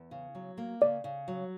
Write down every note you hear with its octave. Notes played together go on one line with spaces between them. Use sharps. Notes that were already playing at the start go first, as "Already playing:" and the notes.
Already playing: E2
C#3
F#3
A#3
C#3 D5
C#3
F#3